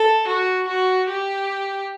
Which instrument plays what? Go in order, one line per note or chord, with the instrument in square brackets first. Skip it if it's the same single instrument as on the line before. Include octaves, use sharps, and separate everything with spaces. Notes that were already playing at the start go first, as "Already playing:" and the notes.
Already playing: [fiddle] A4
F#4
F#4
G4